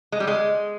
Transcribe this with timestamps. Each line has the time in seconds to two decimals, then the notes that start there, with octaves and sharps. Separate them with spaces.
0.12 G#3
0.20 G3
0.27 G#3